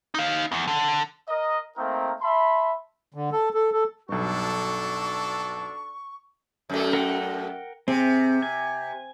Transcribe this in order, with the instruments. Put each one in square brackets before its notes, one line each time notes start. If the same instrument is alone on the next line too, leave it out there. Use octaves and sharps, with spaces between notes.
[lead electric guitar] D#4 F5
E2
D3
[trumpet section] A#4 D#5
A3 A#3 C4 D#4 A#4
E5 A5 B5 C6
[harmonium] D3
A4
A4
A4
[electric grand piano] B1 G2 [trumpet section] D4 F#4 A4 [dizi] C#6
[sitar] F#2 A3
[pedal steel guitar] A#4 F#5 G5
[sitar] C3 [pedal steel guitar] C4 G#4
[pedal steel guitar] G#5